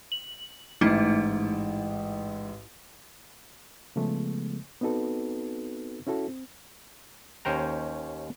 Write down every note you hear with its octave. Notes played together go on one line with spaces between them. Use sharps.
F#7
A1 G#2 A3 D#4 E4 E5
C#3 F3 G#3 A3 B3
B3 C4 D#4 F#4 A4 B4
C#4 E4 F#4 A4
C4
D#2 C#4 C5 G5 A#5